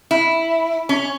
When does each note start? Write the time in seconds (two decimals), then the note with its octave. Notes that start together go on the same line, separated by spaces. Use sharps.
0.11 E4
0.89 C#4